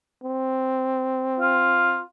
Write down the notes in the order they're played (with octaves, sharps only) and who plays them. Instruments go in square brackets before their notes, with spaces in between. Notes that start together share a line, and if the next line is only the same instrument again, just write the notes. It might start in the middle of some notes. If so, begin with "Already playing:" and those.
[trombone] C4
[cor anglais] F4